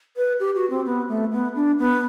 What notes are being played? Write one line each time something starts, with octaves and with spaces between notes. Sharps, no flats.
B4
G4
F#4
C4
B3
A3
B3
D4
B3